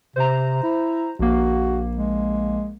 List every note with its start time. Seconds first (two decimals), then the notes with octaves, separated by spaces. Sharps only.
0.16 C3 C5 A#5
0.63 E4
1.19 A#1 A#3 F#4
1.97 G#3